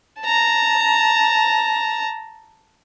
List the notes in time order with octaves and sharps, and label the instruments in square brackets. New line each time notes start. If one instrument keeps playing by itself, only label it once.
[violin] A5 A#5